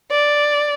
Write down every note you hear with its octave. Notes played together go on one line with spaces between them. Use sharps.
D5